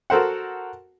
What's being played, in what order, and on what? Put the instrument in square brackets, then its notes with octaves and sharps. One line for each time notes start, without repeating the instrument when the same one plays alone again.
[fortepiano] F#4 A4 A#4 C5 F#5